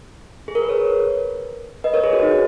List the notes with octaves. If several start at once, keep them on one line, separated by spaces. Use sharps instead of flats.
G#4
A#4
B4
A#4 C#5
B4 D#5
A#4 C#5
G#4
F#4
D#4